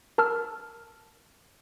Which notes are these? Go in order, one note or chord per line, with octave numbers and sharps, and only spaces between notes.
A#4 A5 E6 F6